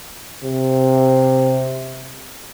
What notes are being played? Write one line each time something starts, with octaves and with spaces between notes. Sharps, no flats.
C3